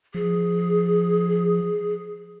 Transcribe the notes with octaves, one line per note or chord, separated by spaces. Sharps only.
F3 G#4